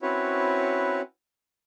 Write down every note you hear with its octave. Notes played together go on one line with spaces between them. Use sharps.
C4 C#4 E4 F#4 B4 C#5